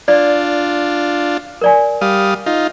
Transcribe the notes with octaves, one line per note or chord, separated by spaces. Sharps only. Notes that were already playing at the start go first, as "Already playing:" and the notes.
D4 F4 D5
A#4 D5 G#5
G3 F5 D#6
D#4 F4